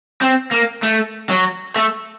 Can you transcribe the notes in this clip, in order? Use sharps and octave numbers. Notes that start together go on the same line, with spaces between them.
C4
A#3
A3
F#3
A3